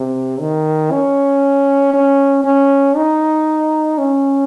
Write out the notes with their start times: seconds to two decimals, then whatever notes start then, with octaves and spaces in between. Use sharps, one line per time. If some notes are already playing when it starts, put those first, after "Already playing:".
Already playing: C3
0.41 D#3
0.91 C#4
1.93 C#4
2.45 C#4
2.96 D#4
3.98 C#4